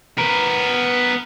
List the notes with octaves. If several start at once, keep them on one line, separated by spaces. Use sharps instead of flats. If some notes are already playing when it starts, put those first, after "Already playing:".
B3 A#4